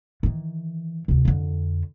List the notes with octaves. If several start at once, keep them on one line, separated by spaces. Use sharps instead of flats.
D#3 E3
D2 C3
F2 D3